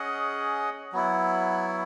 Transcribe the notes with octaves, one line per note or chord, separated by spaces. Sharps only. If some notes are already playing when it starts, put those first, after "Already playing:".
Already playing: C#4 G#4 D#5 F#5
F#3 B3 E4